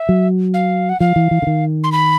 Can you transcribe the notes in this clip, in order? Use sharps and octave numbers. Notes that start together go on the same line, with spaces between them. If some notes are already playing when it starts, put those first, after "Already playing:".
Already playing: E5
F#3
F5
F#5
F3 F5
E3
E3
D3
D#3
C6
B5